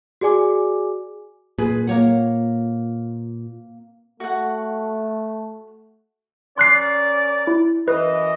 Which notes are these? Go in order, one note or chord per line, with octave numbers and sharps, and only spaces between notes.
F#4 G#4 D5 G#5 D6
A#2 G#4 B4
A#3 C#5 F#5
A3 F#4 F#5
C#4 A#4 D5 C6 F#6 C7
E4
F#2 E3 B4 D#5